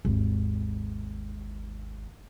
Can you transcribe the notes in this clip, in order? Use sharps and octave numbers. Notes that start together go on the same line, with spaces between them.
G#1 D#2